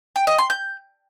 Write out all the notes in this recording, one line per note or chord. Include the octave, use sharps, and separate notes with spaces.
G5
D#5
C6
G6